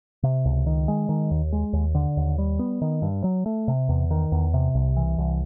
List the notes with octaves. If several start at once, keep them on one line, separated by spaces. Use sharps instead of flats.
C3
C#2
D#3
G#3
D#3
D#2
G#3
D#2
D3
D#2
G3
B3
D#3
G2
F#3
A3
C3
E2
D#3
E2
C3
C2
E3
C2